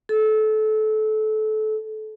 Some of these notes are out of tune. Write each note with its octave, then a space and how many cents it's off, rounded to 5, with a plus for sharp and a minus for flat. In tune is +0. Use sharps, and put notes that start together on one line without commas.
A4 -25